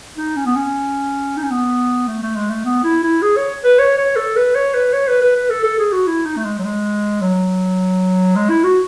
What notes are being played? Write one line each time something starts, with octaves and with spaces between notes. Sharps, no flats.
D#4
C#4
B3
C#4
D#4
C#4
B3
A3
A3
G#3
A3
B3
E4
E4
G#4
C#5
B4
C#5
C#5
A4
B4
C#5
B4
C#5
B4
B4
B4
A4
A4
G#4
F#4
E4
D#4
A3
G#3
F#3
G#3
F#3
G#3
E4
F#4